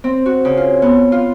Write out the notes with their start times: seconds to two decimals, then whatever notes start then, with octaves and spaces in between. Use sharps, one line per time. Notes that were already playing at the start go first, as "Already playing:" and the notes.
0.04 C4
0.26 F#4
0.45 C#3
0.57 F4
0.82 B3
1.12 F4